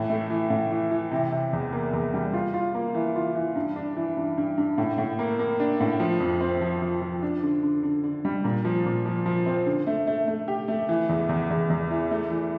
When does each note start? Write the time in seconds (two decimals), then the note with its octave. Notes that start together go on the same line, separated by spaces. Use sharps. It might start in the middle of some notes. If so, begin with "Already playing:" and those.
Already playing: A2 E3
0.09 A3
0.30 E3
0.50 A2
0.71 E3
0.91 E3
1.11 C3
1.32 C3
1.53 E2
1.73 A#3
1.93 E2
2.14 G3
2.33 F4
2.54 F4
2.75 A#3
2.95 E3
3.16 F4
3.35 E3
3.56 G2
3.76 D4
3.97 E3
4.17 G2
4.38 G2
4.58 G2
4.78 A2
4.98 A2
5.19 A#3
5.39 A#3
5.60 D4
5.80 A2
6.00 F3
6.20 F2
6.41 C4
6.61 F3
6.82 F3
7.02 F3
7.22 D4
7.43 D3
7.63 D3
7.83 D3
8.04 D3
8.25 G3
8.44 A#2
8.65 F3
8.86 A#2
9.06 F3
9.26 F3
9.46 C4
9.66 D3
9.87 A3
10.07 A3
10.28 A3
10.48 G4
10.68 A3
10.89 E3
11.09 E2
11.29 E2
11.50 E2
11.70 E2
11.91 E3
12.11 A3
12.31 E3